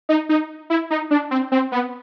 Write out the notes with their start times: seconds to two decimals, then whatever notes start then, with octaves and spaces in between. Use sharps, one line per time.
0.09 D#4
0.29 D#4
0.70 E4
0.91 D#4
1.11 D4
1.31 C4
1.52 C4
1.72 B3